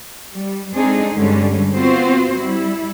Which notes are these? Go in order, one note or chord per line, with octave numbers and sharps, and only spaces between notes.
G3
G#3 A3 C4 D4 D#4 G#4
G2 D3 G3 G#3 C#4
B3 C4 F4 F#4 C5
G3 E4